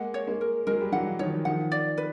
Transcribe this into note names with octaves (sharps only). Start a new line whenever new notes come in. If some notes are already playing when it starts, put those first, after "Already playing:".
Already playing: G#3 A#3 F#5
C#5
G#3 A#3
A#4
F#3 G#3 A#4
G3
E3 F#3 F#5
D#3 F3 C#5
D#3 F3 F#5
D5
B4